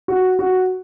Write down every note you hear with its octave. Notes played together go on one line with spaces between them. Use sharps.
F#4
F#4